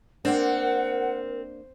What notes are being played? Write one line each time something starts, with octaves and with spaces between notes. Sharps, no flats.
A#3 C4 D4 A#4 F#5